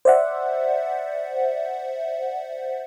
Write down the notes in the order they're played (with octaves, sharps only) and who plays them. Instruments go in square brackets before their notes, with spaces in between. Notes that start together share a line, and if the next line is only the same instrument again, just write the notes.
[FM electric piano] C5 D5 E5 F#5